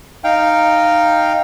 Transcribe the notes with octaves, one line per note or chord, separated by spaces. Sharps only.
D#4 F5 G5